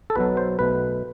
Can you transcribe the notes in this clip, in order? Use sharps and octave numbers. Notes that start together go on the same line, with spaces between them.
A4
B1 B2 F#3 B4
C5
B1 B2 A3 B4